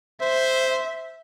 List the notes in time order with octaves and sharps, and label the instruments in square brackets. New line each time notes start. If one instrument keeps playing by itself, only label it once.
[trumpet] C5 [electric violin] E5